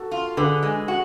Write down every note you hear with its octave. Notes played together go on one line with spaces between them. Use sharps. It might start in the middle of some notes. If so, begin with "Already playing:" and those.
Already playing: F#4 A4
F4
D3 G#4 B4
G#3
F#4